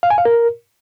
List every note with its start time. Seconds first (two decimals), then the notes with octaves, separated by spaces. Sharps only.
0.03 F5
0.10 G#5
0.18 F5
0.25 A#4